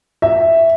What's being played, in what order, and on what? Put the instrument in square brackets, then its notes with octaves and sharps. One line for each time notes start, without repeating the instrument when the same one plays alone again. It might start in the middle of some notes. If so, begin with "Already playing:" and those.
[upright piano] E5